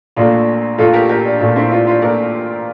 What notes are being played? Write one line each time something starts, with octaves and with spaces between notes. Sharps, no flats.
A#1 A#2 A3 D4 F4
A#1 A#2 A3 F4 A4
G4 A#4
G4 A#4
D4
A#1 A#2 A3 D4
C4 E4
D4 F4
D4 F4
A#2 A3 A#4 D5